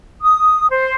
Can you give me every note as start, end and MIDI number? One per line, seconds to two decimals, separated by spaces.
0.21 0.66 87
0.70 0.95 72